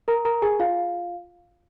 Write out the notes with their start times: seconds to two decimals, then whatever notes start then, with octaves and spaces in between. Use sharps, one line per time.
0.08 A#4 A#5
0.25 A#4 A#5
0.42 G#4 G#5
0.59 F4 F5